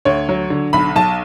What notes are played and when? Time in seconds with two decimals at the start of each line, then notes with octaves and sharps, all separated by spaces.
0.05 D2 C#5
0.29 F#3
0.50 D3
0.73 B1 B5
0.96 B1 A5